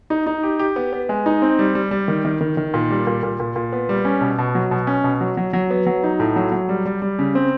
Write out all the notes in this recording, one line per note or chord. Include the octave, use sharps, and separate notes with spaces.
D#4
D#4
G4
G4
B3
B3
G#3
D#4
C4
G3
G3
G3
D#3
D#3
D#3
D#3
A#2
G3
A#2
A#2
A#2
A#2
B3
G3
C#4
B2
B2
F#3
B2
C#4
B2
F#3
F#3
F#3
B3
F#3
D#4
A2
F#3
F#3
G3
G3
G3
C#3
C4